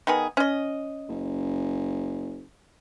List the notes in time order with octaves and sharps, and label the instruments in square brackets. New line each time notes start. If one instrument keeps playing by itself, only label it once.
[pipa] D#3 B3 G#4
C#4 D#5
[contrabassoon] F#1